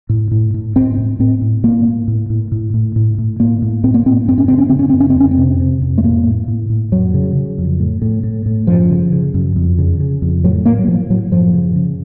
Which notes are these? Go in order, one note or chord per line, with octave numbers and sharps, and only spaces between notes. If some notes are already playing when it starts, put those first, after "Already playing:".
A2
A2
A2
A2 C4
A2
A2 C4
A2
A2 A#3
A2
A2
A2
A2
A2
A2
A2
A2 A#3
A2
A2 C4
A#3
A2 C4
F#2 C4
C#4
C#3 C4
C#4
C#3 C4
C#4
F#2 C4
C#4
C4
F2 C#4
C4
C3
C3
F2
A3
A2 A#3
A2
A2
A2
F2 F#3
C#3
C#3
F2
A2
A2
A2
A2
F#2 F3
C#3
C#3
F#2
F2
C#3
C#3
F2
A2 F#3
A2 A#3
F#3
A2 F3
A2 F#3
F#2 F3
C#3
C#3